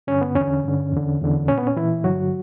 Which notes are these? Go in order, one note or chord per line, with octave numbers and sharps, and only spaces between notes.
G2 D3 C#4
B3
E2 C#4
D3
G2 D3
E2 D3
E2 D3
A#2 C#4
B3
C#4
A#2 E3 E4
G2 D3 F#3 F#4